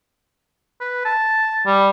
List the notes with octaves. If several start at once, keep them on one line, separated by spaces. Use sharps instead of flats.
B4
A5
G3